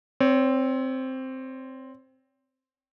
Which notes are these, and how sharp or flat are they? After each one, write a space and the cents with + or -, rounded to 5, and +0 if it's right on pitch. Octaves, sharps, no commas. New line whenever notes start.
C4 +0 C#5 +30